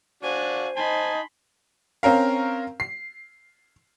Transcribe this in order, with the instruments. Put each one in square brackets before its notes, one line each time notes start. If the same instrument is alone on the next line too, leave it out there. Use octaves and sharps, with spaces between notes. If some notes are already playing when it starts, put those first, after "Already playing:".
[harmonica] D4 F#4 [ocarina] C5 [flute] F5 [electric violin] G#5
[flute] D#4 [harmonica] G#5 A5 [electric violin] B5 C6
[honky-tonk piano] C4 C#4 A#4 F5
C7